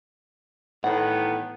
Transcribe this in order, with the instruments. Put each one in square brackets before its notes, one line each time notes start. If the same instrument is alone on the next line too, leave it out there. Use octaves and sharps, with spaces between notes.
[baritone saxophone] A2 [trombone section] D#3 E3 B3 [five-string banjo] F#5